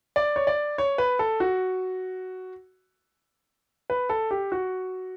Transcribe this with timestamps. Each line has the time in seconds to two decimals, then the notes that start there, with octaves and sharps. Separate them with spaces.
0.16 D5
0.36 C#5
0.47 D5
0.78 C#5
0.98 B4
1.19 A4
1.40 F#4
3.90 B4
4.10 A4
4.31 G4
4.52 F#4